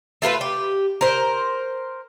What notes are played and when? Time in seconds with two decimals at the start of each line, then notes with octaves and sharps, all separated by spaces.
0.22 A3 F4 A#4 B4
0.41 G4
1.01 A#4 C5